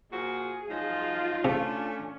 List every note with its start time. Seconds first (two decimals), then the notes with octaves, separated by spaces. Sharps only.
0.12 A#2 F3 F#4 G#4
0.70 F3 F#3 D#4 F4
1.45 C3 A3 C#4 D4